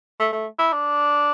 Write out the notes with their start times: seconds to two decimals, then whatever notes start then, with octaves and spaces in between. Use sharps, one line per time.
0.20 A3
0.32 A3
0.59 E4
0.72 D4